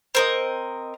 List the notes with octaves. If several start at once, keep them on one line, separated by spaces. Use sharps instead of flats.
C4 A#4 D#5